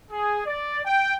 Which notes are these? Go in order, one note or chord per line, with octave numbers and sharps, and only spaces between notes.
G#4
D5
G5